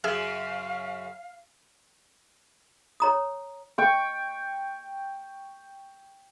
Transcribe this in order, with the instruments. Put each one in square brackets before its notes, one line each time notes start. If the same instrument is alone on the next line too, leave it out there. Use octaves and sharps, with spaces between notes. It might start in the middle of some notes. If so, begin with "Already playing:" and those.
[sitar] F#2 C#3 [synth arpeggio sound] G#4 E5 F6 [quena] F5
[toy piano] C#5 A#5 D#6
[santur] G5 C#6